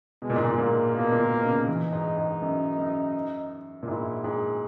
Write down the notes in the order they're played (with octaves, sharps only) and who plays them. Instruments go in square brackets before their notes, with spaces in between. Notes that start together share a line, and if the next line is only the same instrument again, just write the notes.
[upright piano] B2 [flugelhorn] G#3
[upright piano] A#2
G#2
A#2
[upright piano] A#2 [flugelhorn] A#3
[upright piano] B2 [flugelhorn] A#3
[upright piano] A#2
B2
B2
C#3
[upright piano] E3 [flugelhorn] D#4
[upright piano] G#2
G#2
F#2
F#2
A#2
[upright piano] G#2 [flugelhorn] E4
[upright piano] G#2 [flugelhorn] G#4